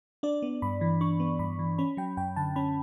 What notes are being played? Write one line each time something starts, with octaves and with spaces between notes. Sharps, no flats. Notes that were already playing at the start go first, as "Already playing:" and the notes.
D4 D5
B3
G2 B5
E3
D4 C#6
B3
G2 B5
E3
C#4 B5
F#3 G5
F#2 G5
D3 A5
C#4 B5